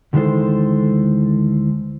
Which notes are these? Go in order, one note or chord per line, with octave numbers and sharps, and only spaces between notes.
D2 D#3 E3 G#3 A4 C5